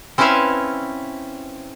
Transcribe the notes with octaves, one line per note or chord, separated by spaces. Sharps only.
C4 C#4 E4 B4 E5 F5